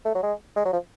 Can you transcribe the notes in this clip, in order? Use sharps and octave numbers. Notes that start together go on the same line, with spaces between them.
A3
F#3
G#3
G#3
F#3
F3